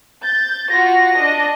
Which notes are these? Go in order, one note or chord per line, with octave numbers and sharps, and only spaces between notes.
G6 A6
F4 F#4 A#6
D4 D#5